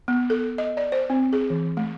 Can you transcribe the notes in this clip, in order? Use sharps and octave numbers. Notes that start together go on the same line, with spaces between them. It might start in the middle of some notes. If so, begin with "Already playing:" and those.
B3
A4
D#5
D5
C5
C4
G#4
E3
A3